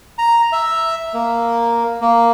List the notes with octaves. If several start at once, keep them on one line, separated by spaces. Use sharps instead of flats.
A#5
E5
A#3
A#3